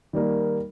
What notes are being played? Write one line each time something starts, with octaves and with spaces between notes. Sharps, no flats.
D#3 G3 A#3